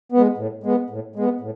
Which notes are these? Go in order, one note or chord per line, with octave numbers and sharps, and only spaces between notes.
B3
G#3
A2
G#3 B3
A2
G#3 B3
A2